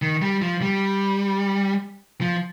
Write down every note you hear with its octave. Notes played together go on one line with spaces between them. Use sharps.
D#3
G3
F3
G3
F3